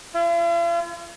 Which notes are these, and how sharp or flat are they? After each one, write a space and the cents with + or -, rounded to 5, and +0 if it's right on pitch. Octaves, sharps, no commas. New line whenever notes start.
F4 -45